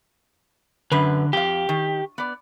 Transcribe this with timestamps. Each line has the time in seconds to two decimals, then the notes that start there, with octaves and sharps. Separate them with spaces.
0.92 F#2 D3 B4
1.33 F2 G4 F5
1.69 D#3
2.18 B3 D5